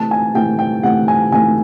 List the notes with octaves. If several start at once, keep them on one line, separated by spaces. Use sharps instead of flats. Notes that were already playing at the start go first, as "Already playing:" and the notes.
Already playing: C3 E3 A3 A5
G#5
C3 E3 A3 G5
G5
C3 E3 A3 F#5
G#5
C3 E3 A3 G#5